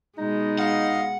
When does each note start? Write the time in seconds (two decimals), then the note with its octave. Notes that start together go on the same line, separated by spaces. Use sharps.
0.18 B2 G#3 D#4
0.58 D#5 F5 F#5